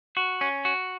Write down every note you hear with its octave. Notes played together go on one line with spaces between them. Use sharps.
F#4
C#4
F#4